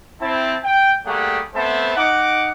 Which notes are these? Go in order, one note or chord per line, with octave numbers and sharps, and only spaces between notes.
C4 E4 A5
G5
G3 A3 A#3 G4 G#4 F#5
A3 B3 C4 C5 E5 A5
D#4 F#5 D6